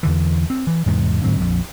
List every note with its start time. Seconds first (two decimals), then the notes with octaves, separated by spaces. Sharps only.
0.03 E2 D3 E3
0.50 C4
0.67 E3
0.86 E2 G#2 C3
1.24 G#2 D3 F#3 C4
1.40 A#1 F2